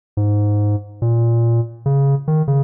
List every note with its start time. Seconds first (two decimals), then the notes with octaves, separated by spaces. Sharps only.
0.17 G#2
1.02 A#2
1.86 C#3
2.28 D#3
2.48 C#3